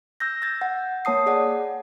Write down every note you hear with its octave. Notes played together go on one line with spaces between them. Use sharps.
E6 G6 A#6
E6 G6 A6
F#5
A#3 C#5 A5 D#6 C7
G#4 D5 F#5